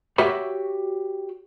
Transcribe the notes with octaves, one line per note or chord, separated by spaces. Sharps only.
F#4 G4 C#5 E5 B5